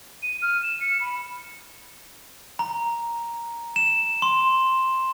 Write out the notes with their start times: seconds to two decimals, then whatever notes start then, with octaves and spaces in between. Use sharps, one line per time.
0.23 D#7
0.42 F6
0.63 E7
0.81 C#7
1.01 B5
2.59 A#5
3.76 E7
4.22 C6